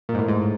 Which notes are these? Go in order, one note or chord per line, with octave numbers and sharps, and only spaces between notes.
A#2
G#2
A2
G#2